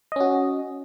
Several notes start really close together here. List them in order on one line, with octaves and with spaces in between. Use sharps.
D#5 C#4 F#4